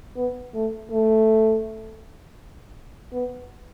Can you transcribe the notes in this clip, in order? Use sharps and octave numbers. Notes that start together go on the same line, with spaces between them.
B3
A3
A3
B3